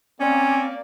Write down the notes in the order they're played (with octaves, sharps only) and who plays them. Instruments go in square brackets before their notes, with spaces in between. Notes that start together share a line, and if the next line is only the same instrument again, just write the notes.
[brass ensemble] A#3 D5 [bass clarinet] C4 [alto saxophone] C#4